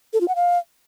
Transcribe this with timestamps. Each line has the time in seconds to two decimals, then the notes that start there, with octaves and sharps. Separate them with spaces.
0.13 A4
0.21 F4
0.28 F#5
0.36 F5